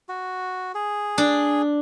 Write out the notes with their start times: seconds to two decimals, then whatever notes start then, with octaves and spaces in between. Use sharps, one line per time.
0.09 F#4
0.75 G#4
1.18 D4